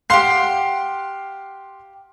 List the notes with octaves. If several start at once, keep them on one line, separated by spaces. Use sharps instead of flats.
G4 F5 F#5 C6 C7